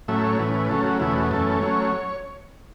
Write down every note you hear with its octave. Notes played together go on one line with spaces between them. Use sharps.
A2 F#3 A3 C#4 E5
C#5
A2 E3 C#4 B4
B4
C#3 F#3 A3 C#4 A4
F#4
E2 B2 A3 C#4 E4
F#4
F#2 E3 A3 C#4 A4
A4
F#3 A3 C#4 C#5